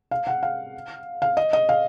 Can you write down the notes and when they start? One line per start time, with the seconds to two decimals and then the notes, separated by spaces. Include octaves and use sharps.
0.11 F5
0.27 F#5
0.43 F5
1.22 F5
1.37 D#5
1.53 D#5
1.69 F5